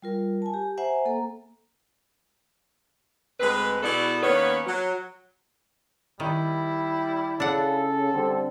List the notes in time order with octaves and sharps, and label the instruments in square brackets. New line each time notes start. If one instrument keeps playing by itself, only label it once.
[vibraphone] G3 F4 A#4
G#5 A5
G4
C5 E5 F#5 G#5 A#5
A#3 A4 A#5
[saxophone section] D2 G#3 C4 B4
B2 E4 F#4 G#4 A4 D5
D#3 A#3 B3 C#4 B4 C#5
F#3
[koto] D#3 [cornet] G3 [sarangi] E4
[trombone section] C#3 [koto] D4 F#5 [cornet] A4
[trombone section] D3 G3 C4